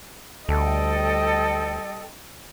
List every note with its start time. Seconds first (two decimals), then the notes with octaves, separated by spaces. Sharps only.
0.49 D2 G3 A4 D#5 G5